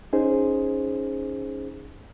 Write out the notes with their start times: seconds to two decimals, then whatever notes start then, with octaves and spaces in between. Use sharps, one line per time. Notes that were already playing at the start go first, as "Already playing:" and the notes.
0.13 C#4 D#4 G#4 C5